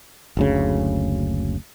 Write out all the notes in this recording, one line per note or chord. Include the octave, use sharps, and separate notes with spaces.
F#1 D2 C#3